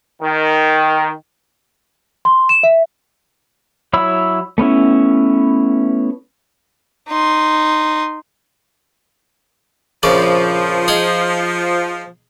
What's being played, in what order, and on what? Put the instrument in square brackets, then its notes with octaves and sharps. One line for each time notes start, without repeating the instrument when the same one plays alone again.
[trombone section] D#3
[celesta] C6
E7
E5
[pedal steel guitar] F#3 E4 C#5 B5 E6
A3 B3 C#4 E4
[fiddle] D#4 C6
[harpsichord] A#1 C#3 D5 [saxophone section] F3
[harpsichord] D#4 G#4